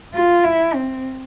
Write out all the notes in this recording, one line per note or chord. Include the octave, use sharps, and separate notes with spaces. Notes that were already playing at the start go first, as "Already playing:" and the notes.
F4
E4
C4